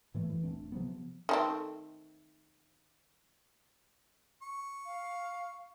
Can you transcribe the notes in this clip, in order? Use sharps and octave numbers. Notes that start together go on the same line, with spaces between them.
A2 E3 A3
F#2 E3
D#1 A3 C4 D4
C3 F3 F#3 B3
D#3 A3 C4
C#6
F5